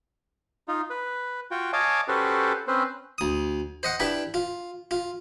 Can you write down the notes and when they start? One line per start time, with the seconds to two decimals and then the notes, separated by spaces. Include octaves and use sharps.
0.68 D#4 F4
0.90 B4
1.51 F4 F#4 G5
1.73 C#5 D#5 F5 G#5 A5 D6
2.08 C#4 F#4 G4 A4 B4 C5
2.68 C4 C#4 B4 C5
3.18 D2 D#6
3.83 C5 D#5 F#5
4.00 D4 E4 G4 B4
4.34 F4
4.91 F4